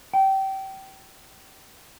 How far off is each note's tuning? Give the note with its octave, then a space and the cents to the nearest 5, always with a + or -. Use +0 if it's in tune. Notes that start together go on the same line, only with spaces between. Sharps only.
G5 -25